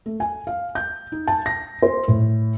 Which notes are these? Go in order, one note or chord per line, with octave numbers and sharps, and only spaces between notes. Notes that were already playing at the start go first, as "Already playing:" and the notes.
A3
G#5
F5
G6
D#4
A5
A#6
C5
A2